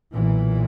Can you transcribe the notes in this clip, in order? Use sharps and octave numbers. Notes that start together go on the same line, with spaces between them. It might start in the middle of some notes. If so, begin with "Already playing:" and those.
B1 A#2 E3